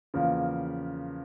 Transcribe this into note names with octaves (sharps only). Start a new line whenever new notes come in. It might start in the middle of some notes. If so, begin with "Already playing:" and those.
E2 C#3 F3 A#3